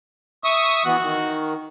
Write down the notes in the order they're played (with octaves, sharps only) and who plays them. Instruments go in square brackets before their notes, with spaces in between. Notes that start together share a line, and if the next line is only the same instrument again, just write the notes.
[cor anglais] E5 [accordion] C#6 D#6
[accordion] E3 B3 [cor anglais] F#4
[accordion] D#3